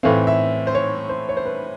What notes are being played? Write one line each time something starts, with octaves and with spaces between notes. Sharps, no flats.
A2 E3 A3 C4 F5
E5
C5
C#5
C5
C#5
C5
B4